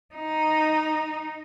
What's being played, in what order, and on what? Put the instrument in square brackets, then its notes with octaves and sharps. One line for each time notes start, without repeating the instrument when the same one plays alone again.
[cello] D#4